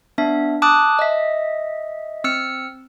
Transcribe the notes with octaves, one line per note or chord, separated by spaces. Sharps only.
B3 D4 E5
A5 D6 D#6 F#6
D#5 E5
C4 E6 F6 C#7